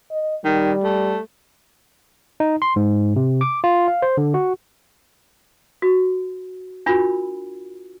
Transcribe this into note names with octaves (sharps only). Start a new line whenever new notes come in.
D#5
D#3 G3
A3
D#4
C6
G#2
C3
D6
F4
F5
C5
D3
F#4
F#4
D4 F4 F#4 A#4 B5